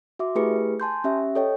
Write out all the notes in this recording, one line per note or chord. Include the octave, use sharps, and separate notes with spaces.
F#4 E5 D6
A3 E4 G4 G#4 B4 C#7
G#5 A5 C6 G6
C#4 G4 E5
A4 C#5 D#5 G5